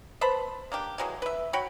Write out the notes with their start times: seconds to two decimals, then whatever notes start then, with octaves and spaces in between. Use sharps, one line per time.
0.21 B4 C5 A5 B5
0.72 A#3 D4 G4
0.98 E3 F#3 G#3
1.22 B4 E5
1.53 F#4 C#5 G5 B5